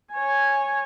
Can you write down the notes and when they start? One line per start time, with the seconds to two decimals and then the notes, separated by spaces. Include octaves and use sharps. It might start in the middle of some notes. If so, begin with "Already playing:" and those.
0.13 C#5 G#5